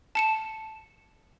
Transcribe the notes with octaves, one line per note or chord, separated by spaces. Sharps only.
A5 C#7 E7